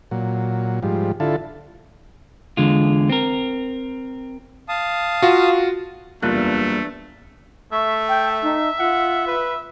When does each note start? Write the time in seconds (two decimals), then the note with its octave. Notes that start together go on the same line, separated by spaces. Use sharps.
0.11 A#2 F#3
0.83 G#2 F3 G3
1.20 D3 E4 F4 A4
2.57 E2 D3 G#3 F4
3.09 C4 A#4
4.69 F5 A5 D#6
5.22 F4 F#4
6.23 F#1 E2 G3 A3 A#3 D4 F4 F#6
7.72 A3 E5 C#6
8.09 G5
8.43 D#4
8.79 F4 F#5
9.27 B4